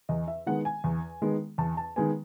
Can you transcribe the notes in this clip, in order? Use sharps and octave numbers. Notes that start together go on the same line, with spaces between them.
E2 D#5
E5
D#3 G#3 B3 F#5
G#5
E2
D#3 G#3 B3
E2 A5
A5
D#3 G#3 B3 G#5